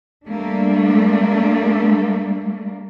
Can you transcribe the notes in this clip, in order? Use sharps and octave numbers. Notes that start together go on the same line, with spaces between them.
G3 A3 A#3 D4